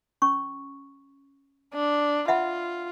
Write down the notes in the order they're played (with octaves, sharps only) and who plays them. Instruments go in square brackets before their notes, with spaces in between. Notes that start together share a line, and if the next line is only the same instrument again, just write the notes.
[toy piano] C#4 C#6
[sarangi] D4
[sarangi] F4 [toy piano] E5 F#5 B5